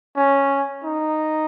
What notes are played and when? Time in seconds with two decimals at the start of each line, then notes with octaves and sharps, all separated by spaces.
0.16 C#4
0.84 D#4